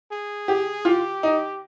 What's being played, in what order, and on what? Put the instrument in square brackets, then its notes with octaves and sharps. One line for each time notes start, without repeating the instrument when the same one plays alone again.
[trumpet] G#4
[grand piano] G4
[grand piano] F4 [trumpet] G4
[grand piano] D#4